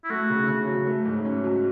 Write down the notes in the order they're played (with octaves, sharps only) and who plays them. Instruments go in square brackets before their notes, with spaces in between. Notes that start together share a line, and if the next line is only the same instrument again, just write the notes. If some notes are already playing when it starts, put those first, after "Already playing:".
[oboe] E4
[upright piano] A3 [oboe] F#4
[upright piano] C#3
C#3
F#3
A3
G#2
C#4
F#3